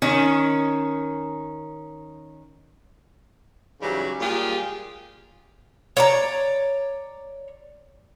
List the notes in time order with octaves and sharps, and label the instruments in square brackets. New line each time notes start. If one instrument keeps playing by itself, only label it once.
[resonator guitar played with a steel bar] D#3 C#4
[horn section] G#2 C#3 E3 F#3 G3
A#2 G3 G#3 F4 G4 G#4
[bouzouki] C#5 D5 A#5